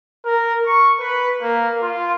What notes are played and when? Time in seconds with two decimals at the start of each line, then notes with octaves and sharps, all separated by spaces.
0.24 A#4
0.65 C#6
1.00 B4
1.42 A#3
1.82 F4